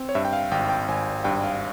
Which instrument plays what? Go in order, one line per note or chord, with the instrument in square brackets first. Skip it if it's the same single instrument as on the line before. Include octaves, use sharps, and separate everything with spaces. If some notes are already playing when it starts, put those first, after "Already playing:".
Already playing: [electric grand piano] C4
C#5
G2 E5
G5
F5
G#1 G5
G5
G#1 G#5
G2 G5
F5